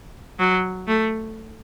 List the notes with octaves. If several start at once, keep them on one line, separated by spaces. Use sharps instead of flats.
F#3
A3